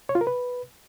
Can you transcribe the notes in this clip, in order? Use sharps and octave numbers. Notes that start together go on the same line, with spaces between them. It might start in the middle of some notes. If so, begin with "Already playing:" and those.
C#5
F4
A#4
B4